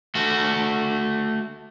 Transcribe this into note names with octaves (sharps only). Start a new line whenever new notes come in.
A3 F#4